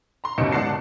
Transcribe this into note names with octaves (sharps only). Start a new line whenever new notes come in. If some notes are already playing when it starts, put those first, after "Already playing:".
A#5 C6
F#1 D#2 B2 D#5 C#7 E7
G#2 D5 F#5 A5 C7